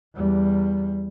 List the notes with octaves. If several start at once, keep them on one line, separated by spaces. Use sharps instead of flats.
E2 G3